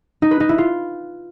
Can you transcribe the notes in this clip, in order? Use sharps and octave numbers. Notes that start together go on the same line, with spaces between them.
D#4
B4
D#4
E4
F4